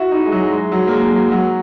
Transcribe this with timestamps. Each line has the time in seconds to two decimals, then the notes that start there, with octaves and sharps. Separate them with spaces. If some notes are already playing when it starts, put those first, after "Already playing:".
Already playing: E4 F#4
0.11 D#4
0.26 G#3
0.32 F#3
0.52 G#3
0.72 F#3
0.87 A#3
0.91 G#3
1.12 F#3
1.31 F#3